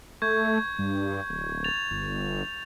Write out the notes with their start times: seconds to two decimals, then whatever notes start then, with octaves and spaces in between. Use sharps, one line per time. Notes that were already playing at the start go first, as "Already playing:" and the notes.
0.22 A3 C#6 G6 G#6
0.79 G2
1.29 D1
1.64 A6 F7
1.91 G1